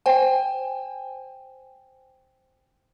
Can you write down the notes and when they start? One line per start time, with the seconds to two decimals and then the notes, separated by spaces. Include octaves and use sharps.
0.06 C5 G5 G#5